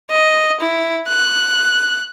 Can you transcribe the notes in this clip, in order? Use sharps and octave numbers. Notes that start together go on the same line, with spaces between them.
D#5
E4
F#6